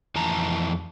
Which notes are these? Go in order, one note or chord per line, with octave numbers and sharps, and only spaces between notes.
F2 E3 A5 A#5